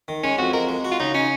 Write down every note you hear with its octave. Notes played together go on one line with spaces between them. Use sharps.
D#3
G#3 C#4
F2 F#4
G#3 A#4
G#3
F#4
F4
C#3 D#4
C#4 D#4